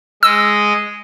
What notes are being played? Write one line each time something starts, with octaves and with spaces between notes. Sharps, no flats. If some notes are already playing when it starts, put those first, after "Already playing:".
G#3 D#5 E6